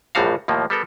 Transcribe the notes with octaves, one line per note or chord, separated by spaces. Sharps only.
A#1 F#2 A2 G3 F#4 F5
D#2 A2 F3 A#3
G3 B3 A4 A#4